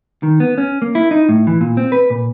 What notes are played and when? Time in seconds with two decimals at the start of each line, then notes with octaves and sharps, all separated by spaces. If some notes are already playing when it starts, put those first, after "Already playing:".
0.23 D#3
0.40 B3
0.58 C#4
0.82 A#3
0.95 E4
1.11 D#4
1.29 A2
1.47 E3
1.61 A#2
1.77 C4
1.92 B4
2.10 A#2